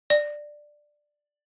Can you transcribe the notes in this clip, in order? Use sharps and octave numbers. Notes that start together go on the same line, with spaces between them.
D5